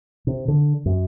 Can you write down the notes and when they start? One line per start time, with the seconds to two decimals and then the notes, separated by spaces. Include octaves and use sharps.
0.27 C3
0.48 D3
0.86 F#2